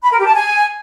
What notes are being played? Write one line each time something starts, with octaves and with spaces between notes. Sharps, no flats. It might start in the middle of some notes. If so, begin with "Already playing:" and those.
B5
A#4
G4
A5
G#5